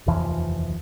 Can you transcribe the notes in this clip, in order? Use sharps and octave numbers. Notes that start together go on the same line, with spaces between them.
F1 D#2 E3 F3